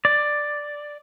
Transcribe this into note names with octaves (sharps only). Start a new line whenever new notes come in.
D5